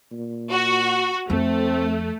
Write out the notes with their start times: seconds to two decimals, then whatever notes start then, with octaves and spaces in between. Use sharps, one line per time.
0.11 A#2
0.51 F#4
1.30 F2 A3 C4